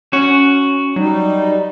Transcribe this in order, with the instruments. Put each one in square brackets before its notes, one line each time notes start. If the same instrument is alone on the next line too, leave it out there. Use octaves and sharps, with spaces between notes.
[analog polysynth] C#4 [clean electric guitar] F#4
[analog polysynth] F#3 [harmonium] G3 D#4